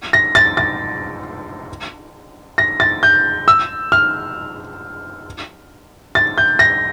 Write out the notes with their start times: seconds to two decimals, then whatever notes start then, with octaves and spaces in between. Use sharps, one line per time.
0.13 A#6
0.35 A6
0.57 A6
2.58 A#6
2.80 A6
3.03 G6
3.48 E6
3.92 F6
6.15 A6
6.38 G6
6.59 A#6